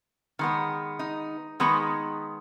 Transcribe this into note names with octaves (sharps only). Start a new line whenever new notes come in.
D#3 G#3 B3
D#4
D#3 G#3 B3